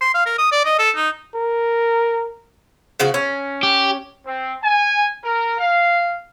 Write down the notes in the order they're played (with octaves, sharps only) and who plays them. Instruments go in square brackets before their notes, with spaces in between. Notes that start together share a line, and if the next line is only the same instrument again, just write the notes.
[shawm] C6
F5
A#4
D#6
D5
D#5
A4
D#4
[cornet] A#4
[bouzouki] C#3 F3 F#4
C#4
[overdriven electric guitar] G4
[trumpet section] C4
G#5
A#4
F5